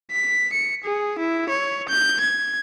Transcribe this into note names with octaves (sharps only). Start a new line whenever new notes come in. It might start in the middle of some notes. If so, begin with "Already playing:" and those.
B6
C#7
G#4
E4
C#5
G6
G#6